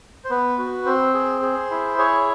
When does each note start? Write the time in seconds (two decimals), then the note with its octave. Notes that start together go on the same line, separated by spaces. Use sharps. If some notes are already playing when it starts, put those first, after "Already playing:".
0.25 C5
0.30 B3 B4
0.58 F#4
0.86 C4 C5
1.14 G#4
1.42 G#4
1.71 E4
1.98 G#4 C#5